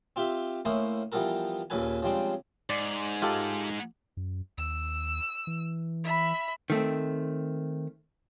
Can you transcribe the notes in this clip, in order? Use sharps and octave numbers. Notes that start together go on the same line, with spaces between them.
C4 F4 G4 E5
A2 A#3 C#4 E4 C5 D#6
E3 F3 G3 B3 A4 A#4
D#2 A#2 C#3 A4 B4 G#5
C#3 F3 G3 G#3 C4 D4
G#2 D5
F4 G4 A4
F#2
D#2 E6
E3
E5 B5
D#3 A3 C4